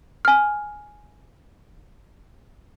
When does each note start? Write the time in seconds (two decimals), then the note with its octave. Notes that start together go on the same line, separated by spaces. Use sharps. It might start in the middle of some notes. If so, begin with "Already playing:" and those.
0.25 G#5 F6